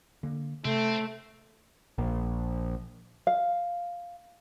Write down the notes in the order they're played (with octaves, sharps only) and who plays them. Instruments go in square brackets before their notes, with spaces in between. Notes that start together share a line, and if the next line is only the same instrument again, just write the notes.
[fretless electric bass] D3 A#3
[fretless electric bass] C3 [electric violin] A3 [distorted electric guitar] C4
[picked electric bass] A#1
[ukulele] F5